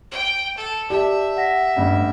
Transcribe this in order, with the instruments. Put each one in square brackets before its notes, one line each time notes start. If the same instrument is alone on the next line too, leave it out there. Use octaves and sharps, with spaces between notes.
[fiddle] G5
A4
[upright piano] G4 [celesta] D5 A5 [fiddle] E5
[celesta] F#5 A#6 B6
[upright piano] A1 G2